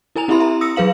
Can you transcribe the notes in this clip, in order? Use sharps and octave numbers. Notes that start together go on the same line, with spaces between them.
E4 A#4 G#5 A#5 F7
C4 E4 G4 E5 B5 C6
E5 A#5
D#6 E6 A#6 C#7
F#3 G#4 B4 F5 F#7